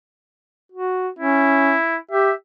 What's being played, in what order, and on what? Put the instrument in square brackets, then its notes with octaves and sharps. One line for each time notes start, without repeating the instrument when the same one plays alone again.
[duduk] F#4
[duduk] C#4 [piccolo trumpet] E4
[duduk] G4 [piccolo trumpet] E5